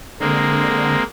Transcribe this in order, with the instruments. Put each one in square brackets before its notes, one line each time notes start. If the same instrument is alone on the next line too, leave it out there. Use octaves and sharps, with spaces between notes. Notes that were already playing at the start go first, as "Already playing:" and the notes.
[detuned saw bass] D3 [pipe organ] G#3 A#3 C4